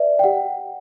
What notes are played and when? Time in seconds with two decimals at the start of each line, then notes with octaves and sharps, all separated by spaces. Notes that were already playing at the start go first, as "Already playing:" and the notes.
Already playing: B4 D5 E5
0.19 G5
0.24 G4 F#5